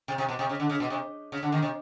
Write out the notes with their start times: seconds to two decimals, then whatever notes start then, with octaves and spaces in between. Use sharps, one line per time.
0.08 C3
0.18 C3
0.29 B2
0.39 C3
0.49 C#3
0.60 D3
0.69 C#3
0.80 B2
0.90 C3
1.32 C#3
1.43 D3
1.52 D#2 D#3
1.62 C3